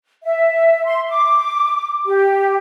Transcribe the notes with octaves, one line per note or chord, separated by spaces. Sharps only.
E5
C6
D6
G4